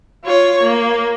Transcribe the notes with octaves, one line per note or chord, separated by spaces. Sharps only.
F4 C#5
A#3